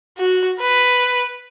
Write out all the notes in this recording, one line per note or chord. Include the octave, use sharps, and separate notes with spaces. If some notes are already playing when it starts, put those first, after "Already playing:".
F#4
B4